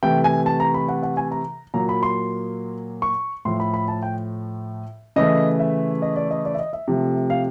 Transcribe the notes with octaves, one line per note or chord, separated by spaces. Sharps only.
C3 E3 A3 G5
G#5
A5
A#5
B5
F#5
F#5
G#5
A#5
A#2 F#3 A#3 A#5
B5
C6
C#6
A2 F3 A3 C6
B5
B5
A5
G5
C#3 E3 A3 D#5
E5
D#5
D5
D#5
D5
E5
D#5
E5
C3 F3 A3
F5